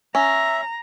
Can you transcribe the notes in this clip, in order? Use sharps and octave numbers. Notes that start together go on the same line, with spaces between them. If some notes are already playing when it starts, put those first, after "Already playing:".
C#4 E5 A#5